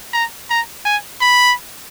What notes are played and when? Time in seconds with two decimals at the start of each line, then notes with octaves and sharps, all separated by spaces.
0.13 A#5
0.50 A#5
0.85 G#5
1.21 B5